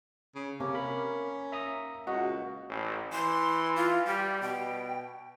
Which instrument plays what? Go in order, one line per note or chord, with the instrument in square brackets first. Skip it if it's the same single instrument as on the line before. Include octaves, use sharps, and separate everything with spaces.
[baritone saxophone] C#3
[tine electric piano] C3 [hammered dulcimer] A#3 [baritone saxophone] C#4
[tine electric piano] A#4 B5
E5 A#5 D#6
[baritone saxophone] C#2 [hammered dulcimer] F#4 [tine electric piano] D#5 F#5
[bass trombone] A1
[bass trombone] E3 [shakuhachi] C6
[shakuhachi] F4
[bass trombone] G3 [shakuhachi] G4
[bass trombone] B2 [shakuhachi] G5